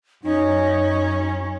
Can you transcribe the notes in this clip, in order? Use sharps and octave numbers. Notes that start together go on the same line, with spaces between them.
F#2 C#4 D#4